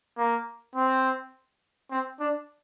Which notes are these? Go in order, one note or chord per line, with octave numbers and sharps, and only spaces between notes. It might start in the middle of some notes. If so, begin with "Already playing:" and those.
A#3
C4
C4
D4